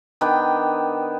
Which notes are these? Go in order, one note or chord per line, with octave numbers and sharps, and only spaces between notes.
D#3 B3 D4 G5